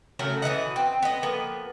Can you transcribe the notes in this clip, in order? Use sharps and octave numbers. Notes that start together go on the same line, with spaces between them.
C#3 F#3 A3 A#4
B2 E3 D#5 F#5
C4
B3 D#5
F3 A#3 B3